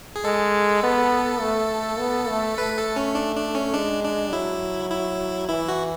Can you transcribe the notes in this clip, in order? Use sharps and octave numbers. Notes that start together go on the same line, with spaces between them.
G#4
G#3 A4
B3
A3
B3
A3
A3 B4
A4
C#4
D4
D4
C#4
G#3 D4
D4
F#3 E4
E4
E3 E4
F#4